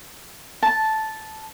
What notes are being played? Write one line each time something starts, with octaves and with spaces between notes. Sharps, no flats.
A5